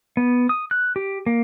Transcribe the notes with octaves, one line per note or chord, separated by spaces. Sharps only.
B3
D#6
F#6
G4
A#3